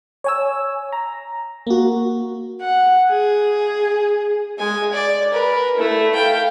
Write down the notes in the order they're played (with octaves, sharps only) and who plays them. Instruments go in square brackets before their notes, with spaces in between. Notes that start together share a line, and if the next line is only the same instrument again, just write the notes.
[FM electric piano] C#5 G#5 E6
A#5
A#3 F#4
[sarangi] F#5
G#4
[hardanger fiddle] G#3 G#5
D5
A#4 B4
A3 E4
F5 G5